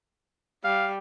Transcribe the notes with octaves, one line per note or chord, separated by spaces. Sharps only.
G3 F5